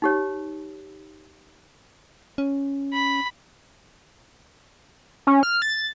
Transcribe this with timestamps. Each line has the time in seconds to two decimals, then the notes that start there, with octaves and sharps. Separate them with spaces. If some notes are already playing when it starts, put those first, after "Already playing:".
0.02 D#4 G4 C#5
2.38 C#4
2.93 B5
5.27 C#4
5.43 F6
5.62 A6